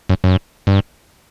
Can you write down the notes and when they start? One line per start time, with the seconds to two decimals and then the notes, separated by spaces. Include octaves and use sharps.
0.09 F#2
0.24 F#2
0.67 G2